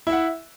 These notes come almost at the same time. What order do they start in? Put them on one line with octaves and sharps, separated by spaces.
E4 E5 F#5